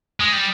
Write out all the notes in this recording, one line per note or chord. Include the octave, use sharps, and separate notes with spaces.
G#3 D#6
G3